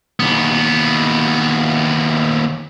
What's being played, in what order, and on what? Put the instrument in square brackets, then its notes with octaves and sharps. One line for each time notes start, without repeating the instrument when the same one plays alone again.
[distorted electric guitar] D#2 B3